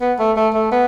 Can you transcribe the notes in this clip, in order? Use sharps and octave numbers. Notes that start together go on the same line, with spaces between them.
B3
A3
A3
A3
B3